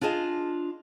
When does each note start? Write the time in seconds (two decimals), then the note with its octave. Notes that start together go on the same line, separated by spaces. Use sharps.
0.01 D4 F4 G#4 D#5 A5